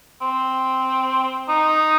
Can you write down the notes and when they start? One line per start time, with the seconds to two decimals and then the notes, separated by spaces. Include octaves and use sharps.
0.21 C4
1.49 D#4